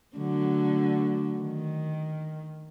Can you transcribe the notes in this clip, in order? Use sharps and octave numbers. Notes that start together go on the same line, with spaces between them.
D3 F#3 A3
D#3